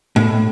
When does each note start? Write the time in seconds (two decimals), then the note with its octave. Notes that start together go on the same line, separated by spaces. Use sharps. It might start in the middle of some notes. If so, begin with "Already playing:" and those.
0.16 A2